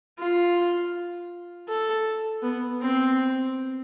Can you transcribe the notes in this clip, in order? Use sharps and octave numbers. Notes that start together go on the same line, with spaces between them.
F4
A4
B3
C4